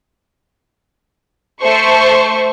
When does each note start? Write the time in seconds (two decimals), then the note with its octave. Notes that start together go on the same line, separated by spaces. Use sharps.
1.62 A3 C5 C#6